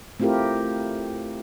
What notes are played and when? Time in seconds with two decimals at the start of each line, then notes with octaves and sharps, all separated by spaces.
0.20 A3 C4 E4 F4 G4 A#4